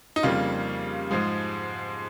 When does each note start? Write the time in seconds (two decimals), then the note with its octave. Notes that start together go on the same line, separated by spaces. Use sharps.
0.16 D#4
0.23 F2 C#3 G3 A#3 F4
1.11 G#2 F3 G#3